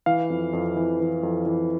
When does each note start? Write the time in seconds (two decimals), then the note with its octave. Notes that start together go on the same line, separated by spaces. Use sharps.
0.06 E3 F5
0.30 F2
0.53 F2
0.77 E3
1.00 E3
1.23 F2
1.46 E3